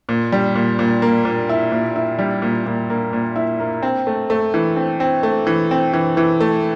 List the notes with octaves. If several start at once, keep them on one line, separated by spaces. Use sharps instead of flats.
A#2
G3
A#2
A#2
A#3
A#2
E4
A#2
E4
G3
A#2
A#2
A#3
A#2
E4
A#3
C4
A3
A3
E3
C4
C4
A3
E3
C4
E3
E3
A3